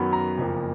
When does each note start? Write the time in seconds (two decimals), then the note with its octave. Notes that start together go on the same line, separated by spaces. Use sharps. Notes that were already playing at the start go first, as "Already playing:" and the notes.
Already playing: F#2 D#3 F#3 B3 B5
0.13 A#5
0.38 F#1 F2 F3 A#3